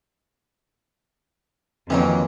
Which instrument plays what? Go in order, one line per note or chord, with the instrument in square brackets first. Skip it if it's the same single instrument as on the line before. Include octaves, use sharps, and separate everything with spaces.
[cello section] F2 [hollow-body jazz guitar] C3 D#3 A#3 [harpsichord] E3 F#3